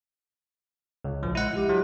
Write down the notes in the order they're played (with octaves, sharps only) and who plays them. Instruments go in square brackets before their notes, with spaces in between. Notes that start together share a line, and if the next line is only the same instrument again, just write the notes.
[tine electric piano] C#2
A#1 F3
[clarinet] G#3 [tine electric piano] E4 F#5
[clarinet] G4
[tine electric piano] F#3